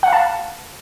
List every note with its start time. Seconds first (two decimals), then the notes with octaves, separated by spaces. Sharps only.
0.03 F#5
0.08 F5
0.13 A5